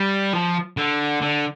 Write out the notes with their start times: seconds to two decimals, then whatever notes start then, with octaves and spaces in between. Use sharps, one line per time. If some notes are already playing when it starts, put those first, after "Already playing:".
Already playing: G3
0.33 F3
0.77 D3
1.22 D3